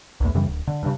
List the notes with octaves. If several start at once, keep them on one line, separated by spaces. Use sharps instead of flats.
B1 E2 A2
F#2 C#3 E3 G3
D1
D3
G2 C#3